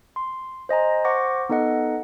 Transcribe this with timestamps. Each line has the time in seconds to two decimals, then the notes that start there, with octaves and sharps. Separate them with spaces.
0.16 C6
0.69 C5 D#5 G#5 A#5
1.05 C5 F#5 C#6 D6 A#6
1.49 B3 D#4 A4 D#5 F#5